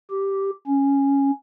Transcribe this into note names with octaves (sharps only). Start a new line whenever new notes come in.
G4
C#4